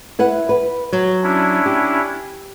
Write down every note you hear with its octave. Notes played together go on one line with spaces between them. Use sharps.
E4 B4 F#5
B4
F#3
C#4 D4 E4
G4